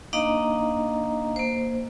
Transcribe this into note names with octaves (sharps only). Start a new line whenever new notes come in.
A#3 D4 D#4 D#5 F5 A#5
A#3 C5